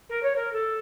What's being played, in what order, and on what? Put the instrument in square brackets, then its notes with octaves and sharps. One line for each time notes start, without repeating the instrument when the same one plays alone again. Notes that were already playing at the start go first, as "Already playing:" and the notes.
[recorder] A#4
C#5
A#4
A4